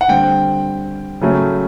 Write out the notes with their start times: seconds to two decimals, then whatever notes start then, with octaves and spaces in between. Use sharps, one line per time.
0.01 F#5
0.08 D3 G3 C4 G5
1.21 C#3 F#3 A3 C#4